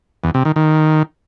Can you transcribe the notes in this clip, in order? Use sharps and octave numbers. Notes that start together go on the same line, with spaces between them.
E2
C3
D#3
D#3